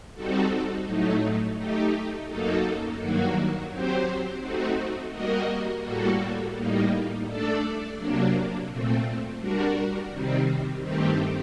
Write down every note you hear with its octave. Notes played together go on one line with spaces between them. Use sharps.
G3 C4 D#4 F#4 A4
A2 F#3 A3 D#4
A3 D#4 G4
F#2 F#3 A#3 D#4 A4
G2 D#3 F#3 A#3 F#4
F#3 C4 G4 C5
A3 C4 D#4 F#4
G3 A#3 F#4 A#4 D#5
A2 G3 A#3 F#4 A4
A2 G3 A#3 D#4
A3 D4 A4 D5
C3 F#3 A#3 D4
A#2 A3 C4
G3 D4 F#4 A#4
C3 D#3 G3 C4
G2 D#3 A3 C4 G4